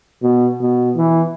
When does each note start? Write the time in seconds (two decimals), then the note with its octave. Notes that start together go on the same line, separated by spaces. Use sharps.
0.22 B2
0.61 B2
0.96 E3